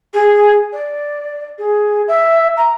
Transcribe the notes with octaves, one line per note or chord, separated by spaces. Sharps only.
G#4
D5
G#4
E5
A#5